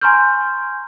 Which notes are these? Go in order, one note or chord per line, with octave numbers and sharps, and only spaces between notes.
G#5 A#5 C6 C#6 F6 G6